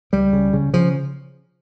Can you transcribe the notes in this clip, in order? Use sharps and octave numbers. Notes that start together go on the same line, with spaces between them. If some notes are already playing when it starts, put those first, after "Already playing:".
C#2 G3
C#3
C#3
C#3 F3